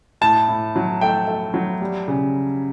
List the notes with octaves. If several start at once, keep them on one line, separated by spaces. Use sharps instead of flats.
A2 A5
A2
F#3
A3 G5
A3
F#3
G3
C#3